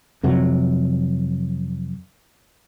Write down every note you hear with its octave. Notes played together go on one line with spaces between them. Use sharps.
F2 C3 F#3